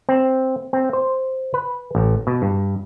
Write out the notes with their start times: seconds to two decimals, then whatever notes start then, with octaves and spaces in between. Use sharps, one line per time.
0.09 C4
0.73 C4
0.93 C5
1.54 B4
1.95 A1
2.27 B2
2.42 G2